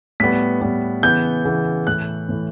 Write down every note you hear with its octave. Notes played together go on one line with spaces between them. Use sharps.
A2 G3 B3 B6
A2 G3 B3
C#3 E3 B3 G6
C#3 E3 B3
A2 E3 A3 F#6
A2 E3 A3